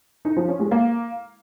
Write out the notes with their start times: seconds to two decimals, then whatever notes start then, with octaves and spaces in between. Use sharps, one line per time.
0.25 D#4
0.36 F3
0.48 C#4
0.60 G#3
0.71 A#3